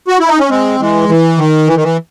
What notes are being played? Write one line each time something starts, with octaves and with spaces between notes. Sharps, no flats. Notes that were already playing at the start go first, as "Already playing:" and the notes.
F#4
E4
D#4
C#4
G#3 C4
E3 G#3
E3
D#3
E3
D#3
E3